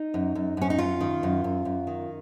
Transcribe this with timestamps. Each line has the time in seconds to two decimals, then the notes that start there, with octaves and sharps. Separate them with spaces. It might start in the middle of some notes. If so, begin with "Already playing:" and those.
Already playing: D#4
0.14 F#2
0.35 F#2
0.57 F#2 C#4
0.70 D#4
0.79 F#2 F4
1.01 D#3
1.23 F#2
1.44 F#2
1.65 F#2
1.87 D#3